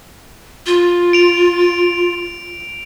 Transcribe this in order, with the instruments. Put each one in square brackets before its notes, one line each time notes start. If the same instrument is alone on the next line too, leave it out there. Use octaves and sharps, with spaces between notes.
[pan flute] F4
[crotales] D7 F7